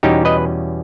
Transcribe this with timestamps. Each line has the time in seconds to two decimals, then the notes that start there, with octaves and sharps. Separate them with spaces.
0.03 E2 B2 G3 C#4 D#4 G4
0.25 B4 D#5